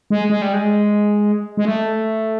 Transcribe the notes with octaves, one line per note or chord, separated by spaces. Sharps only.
G#3
G#3
G3
G#3
G#3
A3